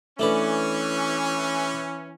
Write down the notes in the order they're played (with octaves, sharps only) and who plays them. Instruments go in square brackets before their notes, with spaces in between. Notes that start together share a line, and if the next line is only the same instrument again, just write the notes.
[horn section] E3 C#4 [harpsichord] A3 D4 B4